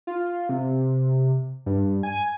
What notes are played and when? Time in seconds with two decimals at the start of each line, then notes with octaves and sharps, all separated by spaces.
0.07 F4
0.49 C3
1.66 G2
2.03 G#5